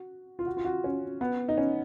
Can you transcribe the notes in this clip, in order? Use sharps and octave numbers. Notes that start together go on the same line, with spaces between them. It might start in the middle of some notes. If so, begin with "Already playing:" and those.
Already playing: F#4
F4
F#4
F4
F#4
C#4
B3
D#4
C#4